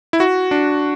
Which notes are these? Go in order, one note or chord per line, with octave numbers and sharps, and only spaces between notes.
E4
F#4
D4